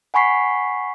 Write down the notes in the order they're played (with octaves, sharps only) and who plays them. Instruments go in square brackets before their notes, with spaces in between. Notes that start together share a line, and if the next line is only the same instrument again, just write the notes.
[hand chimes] F#5 G#5 B5 C#6 B6 C7